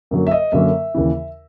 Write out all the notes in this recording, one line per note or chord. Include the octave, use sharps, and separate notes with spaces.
F#2 D3 F#3 A#3
E5
D#5
F#2 D3 F#3 A#3 E5
D#2 C#3 E3